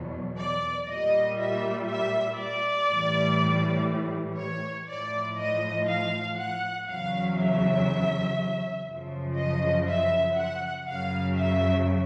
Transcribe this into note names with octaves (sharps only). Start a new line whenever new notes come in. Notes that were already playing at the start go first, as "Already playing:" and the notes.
Already playing: E2 B2 F#3
D5
A#2 G3 D#5
E5
E5
D5
A2 E3 G3
C#5
A2 F3 D5
D#5
F5
F#5
E2 C#3 F#3 F5
E5
F#2 C#3 F3
D#5
E5
F#5
F#2 C#3 F#3 F5
E5